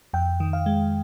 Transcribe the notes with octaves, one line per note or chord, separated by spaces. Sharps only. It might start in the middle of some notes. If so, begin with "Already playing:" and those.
F2 G5
D#3
F5
G#3